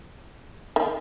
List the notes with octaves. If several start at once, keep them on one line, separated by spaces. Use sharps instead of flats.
D#3